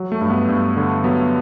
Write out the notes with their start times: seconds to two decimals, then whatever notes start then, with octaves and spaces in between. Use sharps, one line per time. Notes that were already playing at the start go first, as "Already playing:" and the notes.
Already playing: F#3
0.12 A3
0.21 G2
0.30 B3
0.48 G2
0.77 D3
1.04 F#3 B3